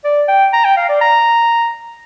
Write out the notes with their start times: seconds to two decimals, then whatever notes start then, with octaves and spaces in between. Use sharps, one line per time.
0.05 D5
0.29 G5
0.53 A#5
0.65 G5
0.77 F5
0.89 D5
1.01 A#5